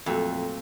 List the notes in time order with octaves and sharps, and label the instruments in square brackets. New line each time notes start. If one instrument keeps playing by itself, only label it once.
[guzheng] F2 [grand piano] A#2 F#3 A3